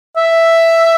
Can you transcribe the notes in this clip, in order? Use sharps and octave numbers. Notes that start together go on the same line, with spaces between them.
E5